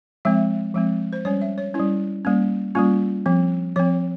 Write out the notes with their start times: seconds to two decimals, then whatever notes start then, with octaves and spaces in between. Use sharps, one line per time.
0.25 F3 G#3 C4 E5
0.74 F3 G#3 C4
1.13 C5
1.25 G3 C#4 C#5
1.42 E5
1.58 C#5
1.74 G3 C#4 E4
2.25 G3 A#3 C#4
2.75 G3 A#3 C#4 F4
3.26 F3 C4
3.76 F3 C4 C#5